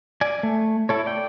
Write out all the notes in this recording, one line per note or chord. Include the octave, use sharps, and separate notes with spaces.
D5 G#5
A3
E4 A4 C#5
D5 G5